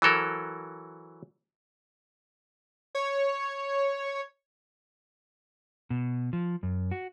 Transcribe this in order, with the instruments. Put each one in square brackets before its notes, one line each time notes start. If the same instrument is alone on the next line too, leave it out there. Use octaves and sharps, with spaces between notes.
[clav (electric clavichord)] E3 F#3 A4 A#4
[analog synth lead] C#5
[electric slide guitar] B2
F3
F#2
F#4